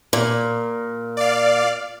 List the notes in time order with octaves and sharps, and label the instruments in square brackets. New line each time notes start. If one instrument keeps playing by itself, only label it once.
[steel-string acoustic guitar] A#2
[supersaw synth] D5 F5